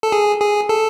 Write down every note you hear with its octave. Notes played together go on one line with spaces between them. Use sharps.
A4
G#4
G#4
A4